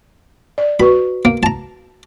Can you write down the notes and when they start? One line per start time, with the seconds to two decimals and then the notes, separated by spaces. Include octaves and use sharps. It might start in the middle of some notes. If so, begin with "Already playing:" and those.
0.58 D5
0.80 F#4 B4 B5 C#6
1.25 A#3
1.43 A5 A#5